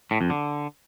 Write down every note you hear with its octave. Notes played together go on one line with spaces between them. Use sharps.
A2
F2
D3